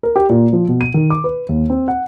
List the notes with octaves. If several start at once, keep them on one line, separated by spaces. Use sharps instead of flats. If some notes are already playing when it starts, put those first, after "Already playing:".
A#4
G4
A#2
F3
B2
D#7
D#3
D6
B4
D#2
C4
F#5